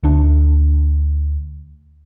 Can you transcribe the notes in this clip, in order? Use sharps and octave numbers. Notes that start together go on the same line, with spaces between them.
D2 D4